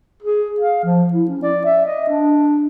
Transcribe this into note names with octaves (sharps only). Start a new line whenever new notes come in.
G#4
F5
F3
E4
C#4
D5
E5
D#5
D4